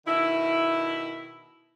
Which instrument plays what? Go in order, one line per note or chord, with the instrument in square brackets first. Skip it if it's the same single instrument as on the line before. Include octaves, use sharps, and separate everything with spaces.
[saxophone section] B2 D#3 E4